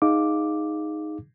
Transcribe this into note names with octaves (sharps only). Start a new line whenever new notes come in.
D#4 G#4 F5 D6